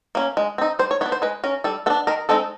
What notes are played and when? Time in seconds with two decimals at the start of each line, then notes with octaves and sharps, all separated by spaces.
0.15 A#3 C#4
0.37 G#3
0.58 C4 D#4
0.79 G3 C5
0.91 C#5
1.01 B3 C#5
1.06 D4
1.12 C5
1.22 G#3 B4
1.44 C#4 A#4
1.64 G3 A4
1.86 B3 A4
1.90 D4
2.07 D#3 A#4
2.29 G#3 C4 D#4 A4